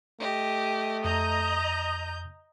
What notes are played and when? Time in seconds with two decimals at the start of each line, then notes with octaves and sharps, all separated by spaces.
0.20 A3 G4 D#5
1.04 F2 D#5 A#5 G6